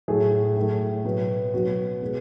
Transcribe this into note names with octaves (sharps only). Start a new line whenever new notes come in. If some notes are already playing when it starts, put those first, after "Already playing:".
A2 F#3 A3 G#4
A2 F#3 A3
B2 F#3 B3
B2 F#3 B3 F#4
B2 G#3